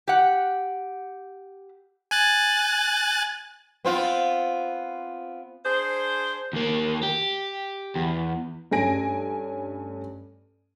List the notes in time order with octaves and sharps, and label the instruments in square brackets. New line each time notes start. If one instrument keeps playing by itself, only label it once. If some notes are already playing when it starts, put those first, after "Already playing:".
[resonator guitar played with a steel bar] G4 F#5
[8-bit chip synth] G#5 F#6 A6
[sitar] B3 C4 F4
[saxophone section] D4 G#4 C5
[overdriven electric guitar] D#2 A#3
G4
E2
[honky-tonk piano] G2 A3 C#4 G#5 A#6 D7